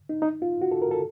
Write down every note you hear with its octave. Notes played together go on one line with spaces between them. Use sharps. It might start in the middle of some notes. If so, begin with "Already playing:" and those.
D#4
D#4
F4
F#4
A4
A#4
A4